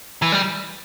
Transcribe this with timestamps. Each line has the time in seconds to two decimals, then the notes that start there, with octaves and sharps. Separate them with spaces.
0.22 E3
0.32 G3